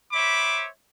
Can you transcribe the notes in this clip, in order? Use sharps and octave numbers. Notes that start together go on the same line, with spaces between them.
C5 C#5 E5 B5 D6